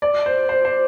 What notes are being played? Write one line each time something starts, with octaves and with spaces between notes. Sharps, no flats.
D5
C5
C5
C5